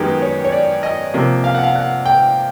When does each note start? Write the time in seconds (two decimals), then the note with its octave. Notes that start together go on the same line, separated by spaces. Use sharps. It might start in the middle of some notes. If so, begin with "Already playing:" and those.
Already playing: F#2 D#3 G#3 B3 G4
0.22 C#5
0.44 C#5
0.52 D5
0.83 D#5
1.14 C3 F3 A#3
1.44 F5
1.55 F#5
1.64 F5
1.76 F#5
2.05 G5